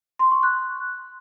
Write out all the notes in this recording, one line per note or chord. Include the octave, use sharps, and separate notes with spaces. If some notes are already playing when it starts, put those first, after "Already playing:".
C6
C#6
F#6